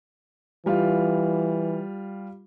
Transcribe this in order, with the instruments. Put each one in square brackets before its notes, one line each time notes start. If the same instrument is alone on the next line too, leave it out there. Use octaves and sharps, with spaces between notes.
[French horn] E3 [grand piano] G3 F4 F5